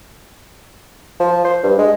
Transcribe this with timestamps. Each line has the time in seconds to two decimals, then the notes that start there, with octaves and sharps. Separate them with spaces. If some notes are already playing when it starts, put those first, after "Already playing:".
1.20 F3
1.45 C5
1.63 G2
1.79 G#3